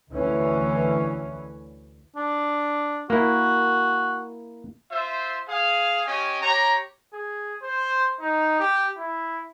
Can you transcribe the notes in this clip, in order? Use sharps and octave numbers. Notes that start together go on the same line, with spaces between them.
D2 E3 C#4
D4
A#3 E4 F#4
F4 C5 E5
G#4 F5
C#4 G4 D#5 G#5
G4 C#5 A#5
G#4
C5
D#4
G4
E4